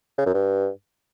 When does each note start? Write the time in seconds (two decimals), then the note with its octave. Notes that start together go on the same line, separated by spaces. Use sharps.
0.18 C#3
0.26 F#2
0.34 G2